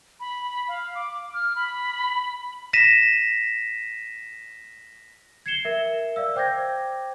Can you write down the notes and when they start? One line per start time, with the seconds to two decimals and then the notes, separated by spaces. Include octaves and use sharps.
0.20 B5
0.68 F5
0.95 D6
1.34 F6
1.56 B5
2.73 A#6 B6 D#7 E7
5.46 G#6 C7 C#7 E7 G7
5.65 A#4 E5
6.16 D5 F5 E6
6.36 C5 G5 D6 G6 G#6 A#6